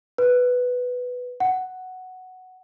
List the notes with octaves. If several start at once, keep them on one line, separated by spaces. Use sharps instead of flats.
B4
F#5